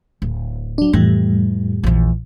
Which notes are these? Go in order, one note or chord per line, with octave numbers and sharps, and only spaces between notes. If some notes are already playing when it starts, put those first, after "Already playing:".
D1
F#3 D4
F2 A2 E3 G3
A#1 E2